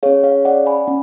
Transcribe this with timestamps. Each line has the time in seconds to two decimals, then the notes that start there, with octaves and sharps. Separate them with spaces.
0.03 C#4 G#4 C#5 F5
0.24 C#5 F5
0.45 D5 F#5
0.66 G#5 B5
0.88 C#4